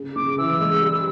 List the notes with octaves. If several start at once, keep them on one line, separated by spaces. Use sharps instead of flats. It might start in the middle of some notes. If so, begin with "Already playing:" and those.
Already playing: C#3
C#3 D6
E3 E6
G#3
G3